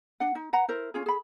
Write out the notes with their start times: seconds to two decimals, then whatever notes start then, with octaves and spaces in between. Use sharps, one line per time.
0.20 D4 F#5
0.35 D#4
0.53 B4 F#5 A#5
0.68 E4 A#4 C5
0.94 C#4 F4 G#4
1.06 G#4 B5